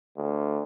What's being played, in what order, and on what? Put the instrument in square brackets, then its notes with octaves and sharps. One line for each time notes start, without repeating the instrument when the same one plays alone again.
[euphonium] D2